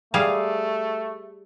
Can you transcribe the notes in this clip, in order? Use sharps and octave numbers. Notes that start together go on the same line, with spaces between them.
G3 A3 G#4 F5